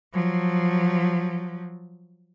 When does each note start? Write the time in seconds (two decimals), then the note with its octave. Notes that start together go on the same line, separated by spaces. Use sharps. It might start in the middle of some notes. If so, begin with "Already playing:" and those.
0.13 F3 F#3